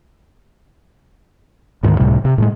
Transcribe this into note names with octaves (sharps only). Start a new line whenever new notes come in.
D2 G#2 D#3
C#2 A2 C3 G3
C3
A2 E3 G#3